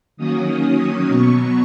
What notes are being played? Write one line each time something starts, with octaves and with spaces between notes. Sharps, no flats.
D#3 F#3 A#3 C#4 D#6
B2 F#3 B3 C#6